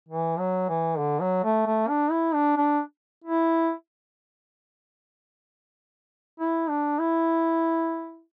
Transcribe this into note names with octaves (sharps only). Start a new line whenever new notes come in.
E3
F#3
E3
D3
F#3
A3
A3
D4
E4
D4
D4
E4
E4
D4
E4